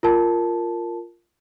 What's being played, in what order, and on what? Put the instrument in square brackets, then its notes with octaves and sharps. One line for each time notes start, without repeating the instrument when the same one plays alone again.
[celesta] F4 A#4 A5